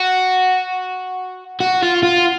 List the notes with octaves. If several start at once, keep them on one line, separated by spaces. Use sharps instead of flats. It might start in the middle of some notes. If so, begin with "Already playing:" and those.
Already playing: F#4
F#4
F4
F4